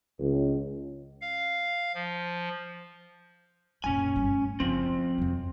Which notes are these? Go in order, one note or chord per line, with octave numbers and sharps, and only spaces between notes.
C#2
F5
F3
F#2 A#2 C#4 G#5
G1
A2
F#1 F3 C4 D#4
E4 F4
F2 F#3